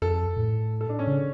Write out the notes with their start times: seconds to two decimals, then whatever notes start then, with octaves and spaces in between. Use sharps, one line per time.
0.02 F2 A4
0.37 A2
0.81 A4
0.89 D4
0.99 C#4
1.07 C#3